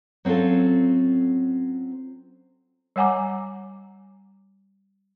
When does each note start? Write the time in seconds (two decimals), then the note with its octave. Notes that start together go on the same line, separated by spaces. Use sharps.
0.25 F#3 C4 C#4 F4 A4
2.96 G3 C#5 F#5 G#5 A#5 D6